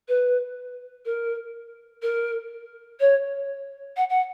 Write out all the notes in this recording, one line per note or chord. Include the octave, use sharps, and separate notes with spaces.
B4
A#4
A#4
C#5
F#5
F#5